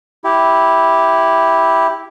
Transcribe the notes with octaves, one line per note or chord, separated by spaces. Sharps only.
E4 G4